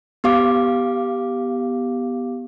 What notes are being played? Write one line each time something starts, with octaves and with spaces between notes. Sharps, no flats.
B3 G4 F5 D6